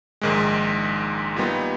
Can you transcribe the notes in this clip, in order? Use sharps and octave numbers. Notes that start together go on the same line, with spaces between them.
A#1 G#2 D#3 G#3
A#2 G3 B3 D#4